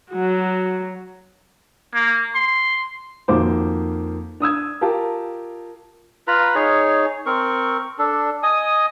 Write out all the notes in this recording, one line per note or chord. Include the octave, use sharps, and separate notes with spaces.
F#3 F#4
A#3
C6
F2 D#3 A#3 F#4 C5 D6
D4 D#6 E6 G#6
F4 G4 A#4 A5
F4 B4 A#5 B5
D#4 G#4 C#5
C4 A#4 C#6
D4 A4
D#5 G#5 D#6